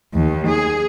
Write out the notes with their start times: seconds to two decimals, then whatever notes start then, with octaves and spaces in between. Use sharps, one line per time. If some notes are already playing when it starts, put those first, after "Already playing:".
0.14 D#2
0.48 G#4